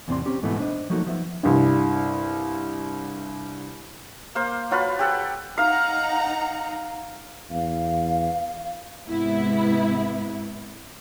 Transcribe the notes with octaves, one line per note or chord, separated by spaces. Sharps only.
E2 A2 C3 C4 D5 C6
C4 C#4 G4
G#2 B2 E3 A3 B3 E4
D4 C5 D#5
F3 F#3 A3 A#3 D#4 F#4
F3 B3 E5
C2 G2
A#3 C5 F5
F#3 F4 B4 F5
G4 A4 F#5
D#4 F5 F#5 A#5
E2 F5
G#2 C3 B3 E4